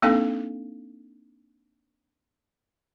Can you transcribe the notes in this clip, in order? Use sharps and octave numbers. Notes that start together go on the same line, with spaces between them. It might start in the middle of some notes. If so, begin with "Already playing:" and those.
A#3 C4 D4 D#4 A4 F5